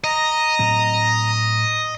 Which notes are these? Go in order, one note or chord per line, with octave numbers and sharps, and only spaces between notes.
D#5 A#5
A2 F#3 C4